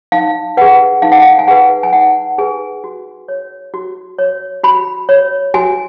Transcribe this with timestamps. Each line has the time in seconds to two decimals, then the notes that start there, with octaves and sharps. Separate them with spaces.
0.12 D#4 F5
0.57 G#4 B4 F#5
1.02 D#4 F5
1.12 F#5
1.22 F5
1.39 G#5
1.48 G#4 B4 F#5
1.83 G#5
1.93 D#4 F#5
2.38 G#4 B4 G#5
2.84 F#4
3.28 C#5
3.74 F#4
4.19 C#5
4.63 F#4 B5
5.09 C#5
5.54 F#4 G#5